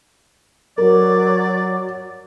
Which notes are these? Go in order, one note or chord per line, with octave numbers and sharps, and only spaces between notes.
F#3 A#4 D5